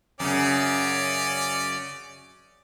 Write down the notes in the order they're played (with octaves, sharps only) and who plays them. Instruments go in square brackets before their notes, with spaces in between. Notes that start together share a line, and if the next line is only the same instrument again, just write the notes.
[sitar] F#2 C#3 [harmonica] C#4 D5